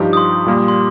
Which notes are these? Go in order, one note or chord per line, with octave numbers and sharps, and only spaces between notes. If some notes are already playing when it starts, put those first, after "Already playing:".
Already playing: G2 F3 D#4 G4
D#6
C6
A#2 G3 A#3
C6